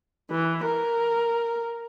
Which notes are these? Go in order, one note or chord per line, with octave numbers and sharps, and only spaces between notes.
E3
A#4